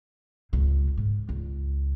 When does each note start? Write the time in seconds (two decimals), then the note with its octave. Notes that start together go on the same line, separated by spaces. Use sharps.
0.53 C#2 C3
0.97 G#2
1.29 C#2